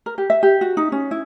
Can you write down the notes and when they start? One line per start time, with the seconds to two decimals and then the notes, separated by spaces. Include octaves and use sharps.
0.06 A#4
0.18 G4
0.30 E5
0.43 G4
0.61 F#4
0.77 D#4
0.92 C#4
1.11 E4